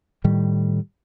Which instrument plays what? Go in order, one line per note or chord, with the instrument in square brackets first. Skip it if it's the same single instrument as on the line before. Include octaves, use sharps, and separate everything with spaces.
[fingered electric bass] A2 D#3 G3